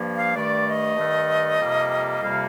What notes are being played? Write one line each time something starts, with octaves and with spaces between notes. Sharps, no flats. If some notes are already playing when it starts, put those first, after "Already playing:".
Already playing: G2 F3 A#3
F5
G2 D#3 A3 D5
D#5
G2 D#3 A3
F2 C3 G3 A#3
F2 C3 G3 A#3 F5